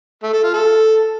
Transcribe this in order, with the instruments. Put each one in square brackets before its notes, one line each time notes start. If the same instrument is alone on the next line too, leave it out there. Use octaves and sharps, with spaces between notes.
[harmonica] A3
A4
F4
A4